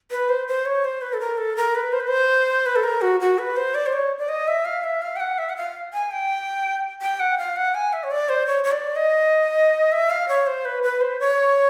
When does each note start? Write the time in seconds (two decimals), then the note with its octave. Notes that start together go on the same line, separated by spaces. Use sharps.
0.11 B4
0.29 C5
0.48 C5
0.65 C#5
0.84 C5
1.01 B4
1.13 A4
1.20 A#4
1.38 A4
1.56 A#4
1.75 B4
1.93 C5
2.00 B4
2.08 C5
2.66 B4
2.76 A4
2.83 A#4
3.01 F#4
3.20 F#4
3.38 B4
3.56 C5
3.75 D5
3.86 C5
3.93 C#5
4.18 D5
4.29 D#5
4.48 E5
4.65 F5
4.84 E5
5.02 F5
5.16 G5
5.20 F#5
5.38 E5
5.49 F#5
5.57 F5
5.93 G#5
6.11 G5
7.02 G5
7.20 F#5
7.38 F5
7.56 F#5
7.75 G#5
7.93 E5
8.03 C#5
8.11 D5
8.29 C5
8.47 C#5
8.64 C#5
8.72 D5
8.96 D#5
9.92 E5
10.10 F5
10.29 C#5
10.47 C5
10.65 B4
10.83 B4
11.01 C5
11.20 C#5